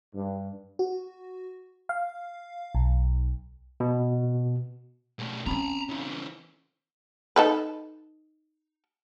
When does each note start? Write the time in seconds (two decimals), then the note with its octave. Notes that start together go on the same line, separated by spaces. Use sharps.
0.13 G2
0.79 F#4
1.89 F5
2.75 B1
3.80 B2
5.19 B2 A3
5.46 C4 C#4 A#5 B5
5.89 C#3 E3
7.36 D#4 A4 B4